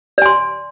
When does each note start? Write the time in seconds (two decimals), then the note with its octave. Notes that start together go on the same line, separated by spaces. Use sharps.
0.18 D5
0.22 G#5
0.26 C6